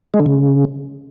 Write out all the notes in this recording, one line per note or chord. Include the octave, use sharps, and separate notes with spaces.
G#3
D3
C#3